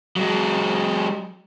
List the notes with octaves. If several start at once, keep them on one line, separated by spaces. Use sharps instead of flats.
F#3 G#3